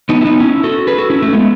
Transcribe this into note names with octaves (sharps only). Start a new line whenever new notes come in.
B3 D#4
E4
B3 D#4
C#4 E4
F#4 A4
G#4 B4
F#4 A4
C#4 E4
A3 C#4
G#3 B3